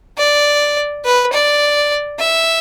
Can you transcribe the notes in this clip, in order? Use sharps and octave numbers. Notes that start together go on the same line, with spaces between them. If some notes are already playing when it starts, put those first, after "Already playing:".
D5
B4
D5
E5